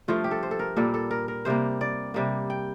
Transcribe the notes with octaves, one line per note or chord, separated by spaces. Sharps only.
G2 F3 A3 F4
G4
A4
C5
A4
A#4
A#2 G3 A#3 A4
A4
A#4
A#4
C3 G3 A#3 C5
D5
C3 G3 A#3
G5